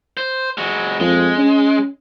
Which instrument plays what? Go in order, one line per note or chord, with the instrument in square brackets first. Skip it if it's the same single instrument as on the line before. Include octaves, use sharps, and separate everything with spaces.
[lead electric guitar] C5
G#3 F#4
[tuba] F2 [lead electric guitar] G#3
[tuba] C#4